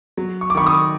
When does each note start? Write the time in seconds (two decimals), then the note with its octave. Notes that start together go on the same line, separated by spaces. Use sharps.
0.17 F#3
0.41 C#6
0.50 D6
0.55 D#3 B5 C#6
0.66 C#6 D#6